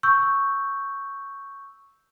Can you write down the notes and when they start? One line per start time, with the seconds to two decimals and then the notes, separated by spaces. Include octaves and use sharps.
0.03 C#6 E6 G6